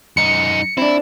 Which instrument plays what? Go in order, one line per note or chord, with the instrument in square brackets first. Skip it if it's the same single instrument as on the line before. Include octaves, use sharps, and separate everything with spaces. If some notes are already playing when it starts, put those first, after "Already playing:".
[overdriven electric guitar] F#2 D#4 [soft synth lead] C#7
[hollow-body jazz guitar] C4 D4 [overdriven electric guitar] E4